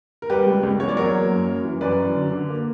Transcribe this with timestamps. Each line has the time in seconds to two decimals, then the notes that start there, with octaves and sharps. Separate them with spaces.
0.22 A#4
0.30 G3 G4 B4
0.46 C#2
0.63 C#2
0.80 E2 C#5
0.88 D5
0.97 F#3 A#4 C#5
1.13 A#3
1.31 F#2
1.47 F#2
1.65 E3
1.81 F#2 B4 D5
1.98 F#2
2.14 D3
2.32 D3
2.49 A#3